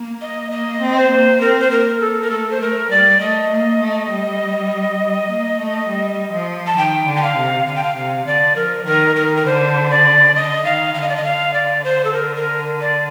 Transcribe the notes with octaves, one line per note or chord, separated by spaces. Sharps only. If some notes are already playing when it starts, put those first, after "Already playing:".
Already playing: A#3
D#5
A#3 D#5
C4
C5
A#3
C4 A#4
C5
A#3 A#4
A#3 A4
A#4
A3 A4
C5
A3 A#4
G3 D5
A3 D#5
A#3
A3
G3
G3
A#3
A3
G3
F3
A5
D#3 G5
D3
G5
F5
C3
D3 F5
G5
F5
C3 F5
D3 D5
F3 A#4
D#3 A#4
D#3 A#4
A#4
D3 C5
D5
D3 D#5
D#3 F5
D3 F5
D#5
D5
D#5
D3 F5
D5
C5
A4
A#4
A#4
D5